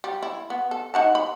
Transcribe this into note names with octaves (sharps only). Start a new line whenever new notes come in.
G3
E4
B3
A4
D#4 F#5 A5
B5